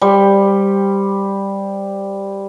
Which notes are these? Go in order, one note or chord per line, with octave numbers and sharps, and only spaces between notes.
G3 C5